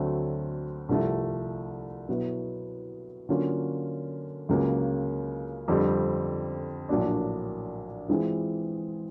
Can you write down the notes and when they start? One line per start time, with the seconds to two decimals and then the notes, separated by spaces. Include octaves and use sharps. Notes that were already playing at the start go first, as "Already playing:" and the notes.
Already playing: D2 D3 F#3 A3 C4
0.89 C2 C3 F3 A3
2.09 B2 F#3 B3 E4
3.29 D3 F#3 A#3 C#4 F4
4.49 C#2 C#3 F#3 A#3
5.68 F2 D3 G3 C4
6.89 A#1 A2 F#3 A#3 D4
8.08 E3 G#3 C4 F4 G#4